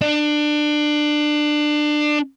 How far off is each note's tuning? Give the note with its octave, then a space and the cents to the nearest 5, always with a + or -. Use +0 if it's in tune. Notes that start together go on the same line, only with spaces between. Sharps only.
D4 +25